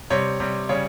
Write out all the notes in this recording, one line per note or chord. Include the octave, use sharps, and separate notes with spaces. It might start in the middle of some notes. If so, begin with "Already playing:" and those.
C3 G3 C#5
C3 G3
C#3 G3 C#5